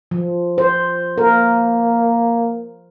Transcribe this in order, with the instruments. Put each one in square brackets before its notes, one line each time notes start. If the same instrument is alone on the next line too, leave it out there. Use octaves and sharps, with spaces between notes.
[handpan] F3
C5
[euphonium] A#3 [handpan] A#4